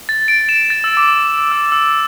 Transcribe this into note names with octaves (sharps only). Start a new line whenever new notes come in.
A6
D7
E7
A6
E6
D6
E6
E6